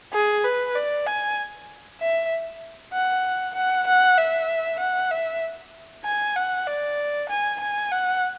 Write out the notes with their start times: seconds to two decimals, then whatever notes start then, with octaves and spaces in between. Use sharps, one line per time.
0.13 G#4
0.44 B4
0.75 D5
1.06 G#5
2.00 E5
2.93 F#5
3.55 F#5
3.87 F#5
4.18 E5
4.80 F#5
5.11 E5
6.05 G#5
6.36 F#5
6.67 D5
7.29 G#5
7.60 G#5
7.91 F#5